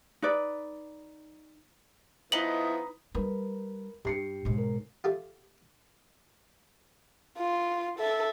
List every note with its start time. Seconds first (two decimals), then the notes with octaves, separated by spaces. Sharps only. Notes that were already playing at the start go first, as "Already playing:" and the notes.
0.22 D#4 B4 D5
2.32 F3 B3 D#4 E4 B4 D#5 F#7
3.15 G3 D#4 A#4 B4
4.05 G2 G4 C7 C#7
4.45 B1 G#2
4.58 A#4
5.04 F4 G4 A4 E5
7.38 F4
7.99 A4 E5